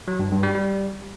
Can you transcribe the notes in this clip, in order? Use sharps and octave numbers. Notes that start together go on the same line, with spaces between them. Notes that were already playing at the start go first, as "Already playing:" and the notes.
F#3
G2
G2
G3
G3